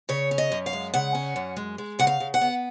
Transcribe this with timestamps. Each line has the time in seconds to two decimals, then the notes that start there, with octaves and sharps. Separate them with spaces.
0.09 C#3 C#5
0.31 C#4
0.38 D#5
0.52 F#2
0.66 F5
0.73 G#3
0.94 C#3 F#5
1.15 C#4
1.36 F#2
1.57 G#3
1.78 G#3
1.99 C#3 F#5
2.07 F5
2.20 C#3
2.34 F#5
2.41 B3